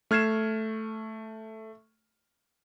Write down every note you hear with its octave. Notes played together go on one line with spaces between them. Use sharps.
A3 F6 G#6 C7 E7